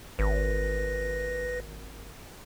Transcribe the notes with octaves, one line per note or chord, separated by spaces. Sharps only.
G#1 B4 A#6